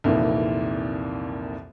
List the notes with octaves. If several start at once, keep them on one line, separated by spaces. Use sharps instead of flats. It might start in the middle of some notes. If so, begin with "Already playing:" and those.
C2 F2 A#2 D#3 E3